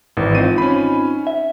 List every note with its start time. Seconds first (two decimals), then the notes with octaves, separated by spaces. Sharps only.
0.17 G#1 E3
0.35 C4 D#4 F4 D#7
0.58 C#4 B5
1.27 E5